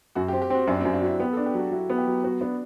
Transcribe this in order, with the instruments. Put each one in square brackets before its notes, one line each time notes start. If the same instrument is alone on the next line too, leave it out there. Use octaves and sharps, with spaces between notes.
[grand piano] F#2 [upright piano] F#4
[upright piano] G4
[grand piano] C4
[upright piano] G4
[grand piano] C4 [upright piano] F#4
[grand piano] F#2 [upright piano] D4
[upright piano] C4
[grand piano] F#2
[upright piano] D4
[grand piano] F#3 [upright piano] E4
[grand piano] B3 [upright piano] G4
[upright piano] A4
[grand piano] D4
[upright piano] G4
[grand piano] F#3 [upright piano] F#4
[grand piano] F#3 [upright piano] E4
[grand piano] B3
[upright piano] G4
[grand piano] F#3
[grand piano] B3 [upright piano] F#4
[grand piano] B3 [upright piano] D4